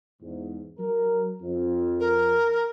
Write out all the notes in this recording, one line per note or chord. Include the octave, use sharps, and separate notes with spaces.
E2 G#2
F#3 A#4
F2
A#4